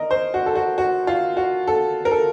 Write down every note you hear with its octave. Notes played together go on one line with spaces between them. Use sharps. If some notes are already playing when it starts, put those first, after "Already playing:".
Already playing: A#4 D#5
C5
F#4
A4
F#4
F#4
F4
F#4
A4
A#4
A4